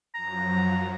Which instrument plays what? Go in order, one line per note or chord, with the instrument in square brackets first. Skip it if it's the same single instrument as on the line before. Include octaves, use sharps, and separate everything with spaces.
[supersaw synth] F#2 F3 F#3 [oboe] A#5